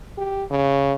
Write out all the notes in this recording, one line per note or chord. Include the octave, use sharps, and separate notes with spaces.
G4
C#3